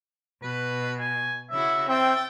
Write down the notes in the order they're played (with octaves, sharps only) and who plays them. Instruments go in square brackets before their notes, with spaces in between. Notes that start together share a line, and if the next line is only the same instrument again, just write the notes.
[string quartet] B2 [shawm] B4
[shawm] G#5
[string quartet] C#3 E4 F#4 [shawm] E5
[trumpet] C4 [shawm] E5 [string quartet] G5 A6